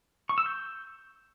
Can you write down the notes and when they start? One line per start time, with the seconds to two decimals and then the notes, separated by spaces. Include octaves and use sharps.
0.29 C#6
0.38 E6
0.46 G6